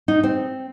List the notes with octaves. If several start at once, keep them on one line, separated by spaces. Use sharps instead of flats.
D#4
C4